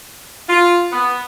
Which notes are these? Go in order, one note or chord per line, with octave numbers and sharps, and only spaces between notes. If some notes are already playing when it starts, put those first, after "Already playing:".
F4
B3